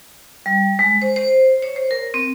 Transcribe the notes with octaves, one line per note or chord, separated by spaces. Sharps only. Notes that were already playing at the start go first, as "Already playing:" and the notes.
G3
G#3
C5
C5
C#5
C5
A#4
C4